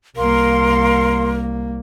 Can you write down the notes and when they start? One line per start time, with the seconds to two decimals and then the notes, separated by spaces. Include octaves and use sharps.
0.16 C2 A#3 A#4 F5 C6